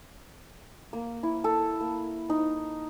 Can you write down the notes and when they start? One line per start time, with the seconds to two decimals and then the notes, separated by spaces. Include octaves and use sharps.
0.93 A#3
1.23 E4
1.44 A4
1.81 A#3
2.30 D#4